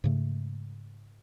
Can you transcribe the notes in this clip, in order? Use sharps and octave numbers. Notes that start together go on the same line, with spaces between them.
G#2 C#3 A3